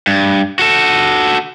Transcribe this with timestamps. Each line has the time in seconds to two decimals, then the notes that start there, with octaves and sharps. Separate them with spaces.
0.07 G2
0.59 F#4 A4